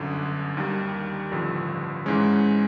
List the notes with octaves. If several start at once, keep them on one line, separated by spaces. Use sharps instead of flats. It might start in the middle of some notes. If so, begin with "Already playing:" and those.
Already playing: G1 F#2 D3
D#2 D#3 G3
A1 G2 D3 F3
G#2 E3 G#3 C#4